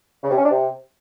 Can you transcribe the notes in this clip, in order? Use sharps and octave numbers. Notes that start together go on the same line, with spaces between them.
C#3
C3
C#4
D4
C3